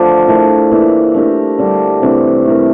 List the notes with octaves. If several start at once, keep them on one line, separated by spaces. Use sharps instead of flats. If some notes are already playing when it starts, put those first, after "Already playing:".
Already playing: D3 F3 A3 D4 F4
A3 E4 A#4
E3 A#3 E4
A3 D4 G4 A#4
D3 G3 D4
C3 E3 A3 D4
A3 E4 A#4